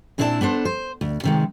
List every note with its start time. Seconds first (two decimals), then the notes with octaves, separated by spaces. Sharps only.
0.18 A#2 C4 D4 E4 C#5 A5
0.41 B3 D4 A4 C5
0.65 C5
1.01 D2
1.24 C3 D#3 G#3